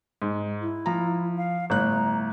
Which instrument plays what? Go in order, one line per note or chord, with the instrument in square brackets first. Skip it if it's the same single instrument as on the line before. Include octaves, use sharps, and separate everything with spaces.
[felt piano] G#2
[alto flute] E4
[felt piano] F3 A#5
[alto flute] F5
[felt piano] G1 A2 F#6 [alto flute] A#5